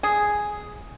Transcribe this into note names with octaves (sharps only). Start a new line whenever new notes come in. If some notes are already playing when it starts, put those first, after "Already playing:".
G#4